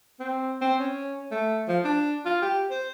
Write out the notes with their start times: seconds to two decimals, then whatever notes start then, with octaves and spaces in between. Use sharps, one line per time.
0.19 C4
0.61 C4
0.80 C#4
1.31 A3
1.68 F3
1.85 D4
2.25 F4
2.42 G4
2.70 C5